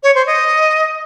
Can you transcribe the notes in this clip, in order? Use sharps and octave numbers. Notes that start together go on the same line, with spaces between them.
C#5
C5
D#5